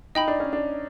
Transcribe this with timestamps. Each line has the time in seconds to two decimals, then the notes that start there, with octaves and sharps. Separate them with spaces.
0.15 D#4 D#5 G5 B5
0.28 D4
0.40 C#4
0.53 D4